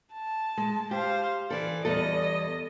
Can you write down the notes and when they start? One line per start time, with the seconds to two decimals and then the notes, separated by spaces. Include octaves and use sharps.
0.13 A5
0.57 G#3
0.91 G4 C5 F5
1.50 E3 A4 D5
1.85 E2 G3 A4 D#5